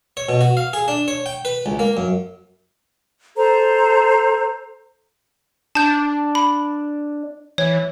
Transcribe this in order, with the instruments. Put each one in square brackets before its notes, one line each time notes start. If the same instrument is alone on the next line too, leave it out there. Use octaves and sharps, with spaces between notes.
[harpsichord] C#5
B2
F#4
F5
G#4
D4
C#5
G5
B4
C#2
A#3
F#2
[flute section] A4 C5 A#5
[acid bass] D4 [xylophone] A5 G6
[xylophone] B5
[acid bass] E3 [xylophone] C#5